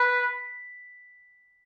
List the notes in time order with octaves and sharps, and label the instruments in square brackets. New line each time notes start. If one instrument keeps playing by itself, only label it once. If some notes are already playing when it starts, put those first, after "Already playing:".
Already playing: [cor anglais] B4 [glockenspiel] B6